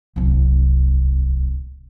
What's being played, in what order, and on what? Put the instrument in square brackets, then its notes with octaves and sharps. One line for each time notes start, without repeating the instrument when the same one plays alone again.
[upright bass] D1 C2